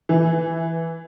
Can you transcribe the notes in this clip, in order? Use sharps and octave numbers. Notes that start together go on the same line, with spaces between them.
E3